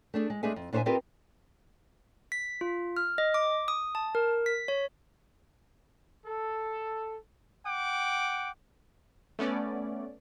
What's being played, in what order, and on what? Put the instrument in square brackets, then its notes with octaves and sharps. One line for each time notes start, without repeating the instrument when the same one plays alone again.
[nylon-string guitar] A3 D4 G#4
G#3
G#3 A3 D4 G#4 E5 G#5
F2
A#2 D4 C5 C#5 E5 G#5
C4 F4 G4 A#4 B4 D#5
[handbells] B6
F4
F6
D#5
D6
D#6
A5
A#4
B6
C#5
[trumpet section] A4
F#5 G5 D6
[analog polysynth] A3 B3 C#4 D5